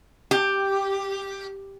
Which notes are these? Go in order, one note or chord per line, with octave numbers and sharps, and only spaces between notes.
G4